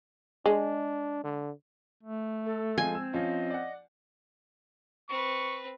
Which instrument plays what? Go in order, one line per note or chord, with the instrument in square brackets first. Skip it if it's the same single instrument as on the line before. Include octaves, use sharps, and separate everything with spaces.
[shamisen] G#3 [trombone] D4
[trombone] D3
[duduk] A3
[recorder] A4
[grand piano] F3 G#3 C4 [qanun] G#5
[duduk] C4 [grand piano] E6
[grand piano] F3 C#4 F4 [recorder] D#5
[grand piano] D5 F#5
[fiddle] C4 B4 [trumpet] C#6